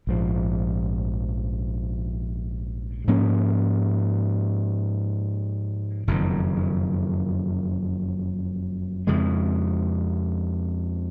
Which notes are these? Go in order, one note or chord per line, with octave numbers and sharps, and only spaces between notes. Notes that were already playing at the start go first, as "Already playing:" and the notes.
A#1 G#2 F3
G#2 F3 A#3 C#4
F#1 F2 D#3
F2 C#3 G#3